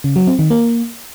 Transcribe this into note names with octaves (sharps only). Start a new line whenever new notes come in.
C#3
F#3
C4
D#3
A#3